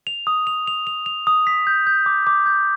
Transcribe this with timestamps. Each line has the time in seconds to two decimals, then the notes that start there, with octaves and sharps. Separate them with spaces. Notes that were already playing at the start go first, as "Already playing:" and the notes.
0.07 F7
0.27 D#6
0.47 F7
0.67 F7
0.87 F7
1.06 F7
1.27 D#6
1.47 B6
1.67 G6
1.87 G6
2.06 D6
2.27 D6
2.46 G6